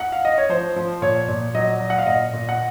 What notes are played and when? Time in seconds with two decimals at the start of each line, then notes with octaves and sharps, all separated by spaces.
0.00 F#5
0.12 F5
0.25 D#5
0.38 C#5
0.49 F3 C5
0.76 F3
1.02 A#2 C#5
1.28 A#2
1.55 F#3 D#5
1.80 F#3
1.90 F#5
1.98 F5
2.06 A#2 D#5
2.33 A#2
2.49 F#5